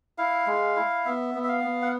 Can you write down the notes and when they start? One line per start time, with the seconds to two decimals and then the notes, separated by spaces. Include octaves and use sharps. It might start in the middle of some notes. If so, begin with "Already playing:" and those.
0.18 E4 F5
0.47 G#3
0.76 E4
1.05 B3 E5
1.35 B3
1.44 E5
1.49 F5
1.64 B3
1.82 F#5